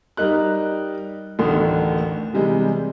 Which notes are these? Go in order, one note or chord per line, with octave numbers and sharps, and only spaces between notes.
G3 D#4 A#4 F#6
A1 D2 D3 D#3
C3 E3 G3 G#3